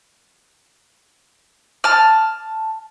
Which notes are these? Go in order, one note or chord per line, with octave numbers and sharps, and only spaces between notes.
A5 F6